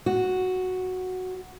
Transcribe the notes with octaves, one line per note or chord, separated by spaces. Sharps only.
F#4